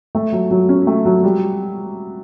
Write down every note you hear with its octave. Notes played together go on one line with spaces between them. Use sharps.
A3
F#3
F#3
C#4
A3
F#3
G3